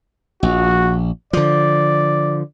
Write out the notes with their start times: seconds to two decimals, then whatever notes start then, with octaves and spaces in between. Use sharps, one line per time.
0.43 A#1 F#4
1.33 D3 F3 D5